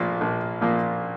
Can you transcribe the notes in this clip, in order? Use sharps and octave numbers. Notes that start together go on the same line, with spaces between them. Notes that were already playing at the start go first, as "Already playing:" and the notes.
Already playing: A#1 A#2 F3 A#3
A#1
A#2 F3 A#3